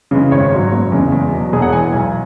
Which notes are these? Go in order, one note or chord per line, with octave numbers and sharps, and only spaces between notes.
C#3 E3 G#3
G#1 C#5
G#2 F#3
F#1
E2 C#3 G#3
E2
B2 F#3
E1 G#4
F#5
E2 E3 G#3 G#5
B1 G#5